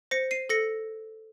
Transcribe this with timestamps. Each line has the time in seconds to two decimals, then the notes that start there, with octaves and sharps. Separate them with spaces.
0.11 C5 A#6 C#7
0.31 C7 D#7
0.49 A4 A#6 C#7